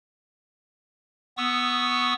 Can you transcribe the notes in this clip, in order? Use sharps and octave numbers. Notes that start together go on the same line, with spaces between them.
B3 C#6 D#6 E6